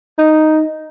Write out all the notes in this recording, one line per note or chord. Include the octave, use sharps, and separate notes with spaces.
D#4